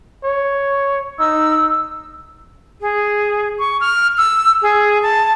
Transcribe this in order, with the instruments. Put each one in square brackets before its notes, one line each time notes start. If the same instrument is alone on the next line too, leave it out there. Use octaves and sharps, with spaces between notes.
[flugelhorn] C#5
[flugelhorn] D#4 [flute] E6
[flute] G#4
C#6
F6
E6
G#4
A5